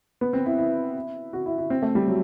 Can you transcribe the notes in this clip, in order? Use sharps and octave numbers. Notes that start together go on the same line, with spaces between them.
B3
C4
E4
E4
F#4
E4
E4
C4
A3
G3
F#3